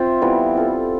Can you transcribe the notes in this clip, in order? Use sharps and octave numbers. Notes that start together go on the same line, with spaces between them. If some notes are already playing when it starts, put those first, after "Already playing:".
Already playing: C4 F4 C5 E5
E3 G3 B3
C4 F4 A4